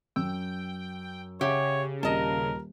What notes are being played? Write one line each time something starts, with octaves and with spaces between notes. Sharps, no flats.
F#2 G5 E6
C#3 G4 C#5 E5 F#5 G#5
D#1 G4 A#4 D#5 A5